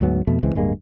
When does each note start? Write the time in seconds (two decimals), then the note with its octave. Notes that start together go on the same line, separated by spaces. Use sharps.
0.01 D2 G#2 F#3 B3
0.27 F2 B2 A3
0.43 C#2 E3 G#3 C4
0.55 D1 G2 G#3 A#3